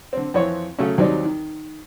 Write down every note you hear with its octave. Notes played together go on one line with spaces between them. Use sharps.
D3 C4
F2 E3 C4 C#5
C#3 F#3 A3 C#4
D#2 F#3 G3 C4 D#4 D5
D#3